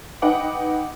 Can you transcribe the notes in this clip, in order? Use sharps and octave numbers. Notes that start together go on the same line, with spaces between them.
D#4 B4 D#5 F#5 G5 D6